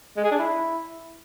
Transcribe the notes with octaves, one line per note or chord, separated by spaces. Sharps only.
G#3
G#4
D4
E4